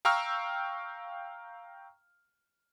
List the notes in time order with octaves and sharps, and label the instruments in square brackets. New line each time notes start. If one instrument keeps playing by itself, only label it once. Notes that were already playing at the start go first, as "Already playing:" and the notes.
[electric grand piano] F5 G5 A#5 C#6 E6 F6